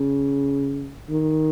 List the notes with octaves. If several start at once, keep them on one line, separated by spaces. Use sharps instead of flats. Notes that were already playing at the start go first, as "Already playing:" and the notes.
Already playing: C#3
D#3